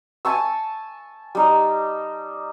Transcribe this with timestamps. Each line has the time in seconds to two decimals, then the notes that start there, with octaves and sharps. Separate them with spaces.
0.25 G#5 A5 C#6 E6
1.35 G3 D#4